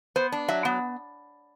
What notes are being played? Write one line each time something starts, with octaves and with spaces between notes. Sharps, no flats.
B3 C5
D4
F#3 E5
B3